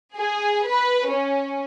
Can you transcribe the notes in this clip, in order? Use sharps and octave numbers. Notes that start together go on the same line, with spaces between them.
G#4
B4
C#4